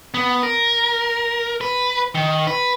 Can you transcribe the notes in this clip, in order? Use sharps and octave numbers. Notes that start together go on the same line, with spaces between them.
B3
A#4
B4
D#3
B4